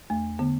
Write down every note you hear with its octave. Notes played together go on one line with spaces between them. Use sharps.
E2 A3
D3 B3